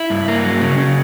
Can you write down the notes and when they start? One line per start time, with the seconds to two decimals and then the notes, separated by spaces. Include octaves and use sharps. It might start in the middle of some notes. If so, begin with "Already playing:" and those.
Already playing: E4
0.10 G2
0.28 A#3
0.44 F#3
0.61 C#3
0.78 C#3